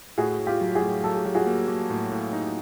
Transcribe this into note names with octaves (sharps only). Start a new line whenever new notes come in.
A2 F#4 G#4
A2
F4 G4
F#3
F#4 G#4
A2
F#3 A4
G#4
F#3 G4
F#4 G#4
A#3
A#3
A2
A2
D#4